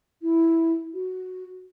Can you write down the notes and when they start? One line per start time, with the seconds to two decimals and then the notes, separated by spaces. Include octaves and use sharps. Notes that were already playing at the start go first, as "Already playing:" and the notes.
0.22 E4
0.94 F#4